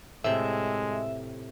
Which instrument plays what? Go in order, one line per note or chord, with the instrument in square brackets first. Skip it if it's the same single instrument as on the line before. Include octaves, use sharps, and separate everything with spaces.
[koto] A2 C3 [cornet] G#3 [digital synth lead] E5